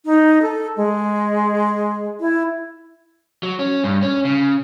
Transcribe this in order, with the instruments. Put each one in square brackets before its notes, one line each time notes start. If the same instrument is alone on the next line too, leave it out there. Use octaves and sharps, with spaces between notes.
[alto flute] D#4
A4
G#3
E4
[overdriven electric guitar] F#3
C#4
G2
C#4
C#3